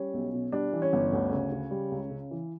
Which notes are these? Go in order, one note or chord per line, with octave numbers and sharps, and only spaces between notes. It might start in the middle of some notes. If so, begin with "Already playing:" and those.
Already playing: G3 C#4
B1
B2
G3 D4
E3
C#4
G1
D2
C#3
C#3
G3
C#2
C#3
E3